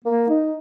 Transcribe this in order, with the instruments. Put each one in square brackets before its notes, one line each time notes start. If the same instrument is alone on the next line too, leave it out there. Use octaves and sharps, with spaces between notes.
[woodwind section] A#3
D#4